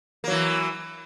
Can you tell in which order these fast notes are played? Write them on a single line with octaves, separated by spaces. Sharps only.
A#3 F#3 E3